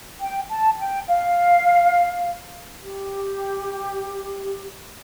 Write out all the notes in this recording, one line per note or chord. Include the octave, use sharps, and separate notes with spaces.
G5
A5
G5
F5
G4